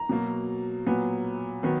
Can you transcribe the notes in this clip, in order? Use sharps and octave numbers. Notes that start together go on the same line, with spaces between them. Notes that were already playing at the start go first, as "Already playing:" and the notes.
Already playing: A#5
B2 F#3 A#3
A#2 F#3 B3
D#3 F#3 B3